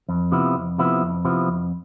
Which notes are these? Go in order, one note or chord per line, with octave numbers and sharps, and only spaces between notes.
F2
C3 F3 B3 E4
F2
C3 F3 B3 E4
F2
C3 F3 B3 E4
F2